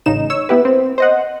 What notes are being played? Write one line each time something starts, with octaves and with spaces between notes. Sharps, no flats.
A1 C#3 D#4 E7
C#5 E6
B3 E4 G4 B4
C4
C5 D#5 F#5